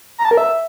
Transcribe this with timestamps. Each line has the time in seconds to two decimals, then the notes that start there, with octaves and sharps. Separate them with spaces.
0.18 A#5
0.25 A5
0.31 A#4
0.37 E5